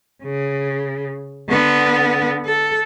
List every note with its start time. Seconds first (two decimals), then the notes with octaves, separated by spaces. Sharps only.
0.23 C#3
1.49 D3 B3
2.45 A4